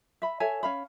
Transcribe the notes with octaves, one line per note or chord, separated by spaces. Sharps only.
E5 B5
A4 C#5 E5 G#5
C#4 F5 B5